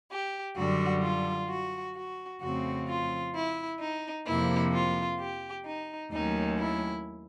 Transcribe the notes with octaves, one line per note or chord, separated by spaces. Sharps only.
G4
F#2 D3 G3 F#4
F4
F#4
F#4
F2 C#3 F3 A3 C4 F#4
F4
E4
D#4
F2 C3 F3 A#3 E4
F4
G4
D#4
D#2 D#3 F#3 A3 C#4 D#4
E4